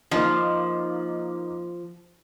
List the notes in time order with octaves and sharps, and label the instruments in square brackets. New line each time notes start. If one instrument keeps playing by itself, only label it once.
[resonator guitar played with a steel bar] F3 [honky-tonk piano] A#3 D#4